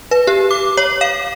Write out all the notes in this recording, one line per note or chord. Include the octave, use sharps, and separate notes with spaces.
B4
G4
D6
C#5
F5